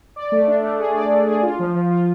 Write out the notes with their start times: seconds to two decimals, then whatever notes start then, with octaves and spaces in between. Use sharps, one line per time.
0.16 D5
0.32 A3
0.48 D4
0.64 A3
0.80 G#4
0.95 D5
1.12 A3
1.27 G#4
1.43 F4
1.59 F3
1.75 F3
1.91 F4